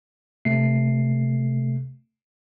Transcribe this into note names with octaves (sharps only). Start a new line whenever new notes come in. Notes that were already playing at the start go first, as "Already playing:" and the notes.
C3 A3 C7